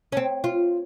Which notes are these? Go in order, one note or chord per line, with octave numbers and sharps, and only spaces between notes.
C#4
C4
F4